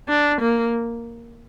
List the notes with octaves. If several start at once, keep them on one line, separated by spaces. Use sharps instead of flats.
D4
A#3